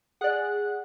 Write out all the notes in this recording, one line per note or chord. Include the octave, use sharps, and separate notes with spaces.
G#4 D5 F#5 F#6